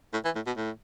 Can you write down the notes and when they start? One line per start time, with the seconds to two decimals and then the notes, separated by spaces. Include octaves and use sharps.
0.13 A2
0.25 E3
0.35 A2
0.46 B2
0.57 A2